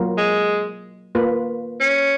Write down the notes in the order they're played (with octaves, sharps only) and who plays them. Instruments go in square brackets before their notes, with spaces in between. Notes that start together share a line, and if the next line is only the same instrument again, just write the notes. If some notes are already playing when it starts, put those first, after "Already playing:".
Already playing: [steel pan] F#3 A#3 F4 A#4
[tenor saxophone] G#3
[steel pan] A#3 F4 B4
[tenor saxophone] C#4